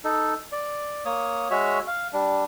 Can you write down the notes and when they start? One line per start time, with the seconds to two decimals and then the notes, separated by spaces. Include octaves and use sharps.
0.04 D#4 A4
0.52 D5
1.05 A#3 C#5 D#6
1.51 G#3 F#4 C#5 E5
1.87 F5
2.13 G3 D4